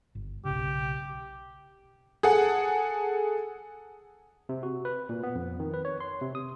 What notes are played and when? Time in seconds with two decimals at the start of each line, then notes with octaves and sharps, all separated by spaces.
0.15 G1
0.45 B1 C#3 G4
2.23 G#4 A4 F#5
4.49 C3
4.63 F#4
4.85 B4
5.09 A#2
5.23 B3
5.35 F2
5.60 D#3
5.74 B4
5.85 C#5
6.00 C6
6.21 C3
6.35 D#6